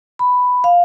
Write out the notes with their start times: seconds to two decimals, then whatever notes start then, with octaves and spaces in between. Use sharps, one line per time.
0.19 B5
0.64 F5